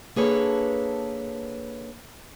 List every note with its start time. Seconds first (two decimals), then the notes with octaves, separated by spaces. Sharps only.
0.16 A#3 D4 G#4 A4 B4 C#5